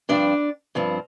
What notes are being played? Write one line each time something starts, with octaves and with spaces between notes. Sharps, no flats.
G2 F3 C4 D4 D5
G2 F3 C4